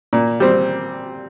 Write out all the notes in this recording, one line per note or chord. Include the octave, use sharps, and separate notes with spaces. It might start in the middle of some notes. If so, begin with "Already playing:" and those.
A#2
G3 C4